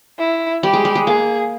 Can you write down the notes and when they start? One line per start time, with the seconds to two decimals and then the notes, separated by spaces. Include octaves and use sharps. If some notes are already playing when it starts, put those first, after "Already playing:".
0.19 E4
0.63 G3 G4
0.73 G#3
0.85 G3
0.95 G#3
1.07 A#3 G#4